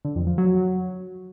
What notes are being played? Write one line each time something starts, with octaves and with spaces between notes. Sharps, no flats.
D3
F2
F3
F#3